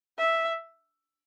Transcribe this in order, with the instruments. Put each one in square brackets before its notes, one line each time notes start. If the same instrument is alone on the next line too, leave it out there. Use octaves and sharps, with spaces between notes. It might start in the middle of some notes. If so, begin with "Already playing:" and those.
[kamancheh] E5